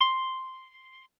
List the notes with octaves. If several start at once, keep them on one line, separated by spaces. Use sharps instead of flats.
C6